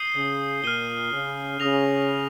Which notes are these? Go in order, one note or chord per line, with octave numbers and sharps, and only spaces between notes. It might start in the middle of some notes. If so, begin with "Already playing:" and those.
Already playing: D#6 G6 C7 D#7 G7
C#3
A#2 F6 C7 D#7 G7
C#3
C#3 D#6 A#6 F7